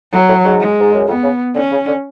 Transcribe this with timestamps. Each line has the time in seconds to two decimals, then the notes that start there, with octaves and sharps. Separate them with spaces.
0.13 A2 F#3
0.29 A2
0.44 G#2
0.60 G#3
0.80 G#2
0.94 F#2
1.08 F2 B3
1.23 C#3
1.55 D3 C#4
1.72 C#3
1.87 D3